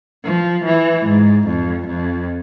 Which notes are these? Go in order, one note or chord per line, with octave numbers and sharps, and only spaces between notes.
F3
E3
G#2
F2
F2